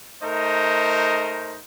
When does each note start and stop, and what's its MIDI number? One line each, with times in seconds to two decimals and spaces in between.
0.22 1.57 57
0.22 1.57 63
0.22 1.57 70
0.22 1.57 72
0.22 1.57 75